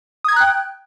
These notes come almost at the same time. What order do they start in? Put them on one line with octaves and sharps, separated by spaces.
D#6 G#6 A#5 F#6 G5